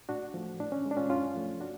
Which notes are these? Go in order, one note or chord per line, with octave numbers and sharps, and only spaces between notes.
A2 D4 F#4
F3 A3
A2 D4
C#4
G#3
D4
C#4 F4
F#2 C#4 F4
F3 A3
D4 F#4